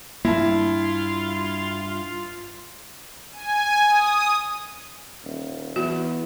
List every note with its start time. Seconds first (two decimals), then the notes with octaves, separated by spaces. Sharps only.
0.25 G2 A#3 E4 F4 A5
3.33 G#5
3.89 D#6
5.24 D#1
5.76 E2 F#4